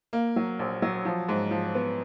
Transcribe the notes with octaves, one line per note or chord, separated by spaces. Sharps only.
A#3
F#3
A#1
F#3
F3
G#2
F3
B3